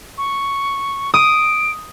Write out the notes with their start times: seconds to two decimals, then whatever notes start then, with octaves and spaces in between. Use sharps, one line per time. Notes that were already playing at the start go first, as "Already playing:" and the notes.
0.18 C#6
1.14 D#6 D7